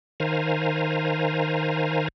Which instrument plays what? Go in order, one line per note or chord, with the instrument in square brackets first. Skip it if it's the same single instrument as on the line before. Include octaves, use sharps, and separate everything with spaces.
[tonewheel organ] D#3 C5 F5 G#5 A#5